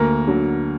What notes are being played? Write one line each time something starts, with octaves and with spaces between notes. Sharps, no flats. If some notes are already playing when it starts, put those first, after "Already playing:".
Already playing: D2 A#3 A#4
D3 F#3